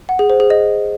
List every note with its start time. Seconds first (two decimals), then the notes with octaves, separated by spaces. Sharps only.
0.09 F#5
0.19 G#4
0.30 C5
0.40 G#4
0.50 D#5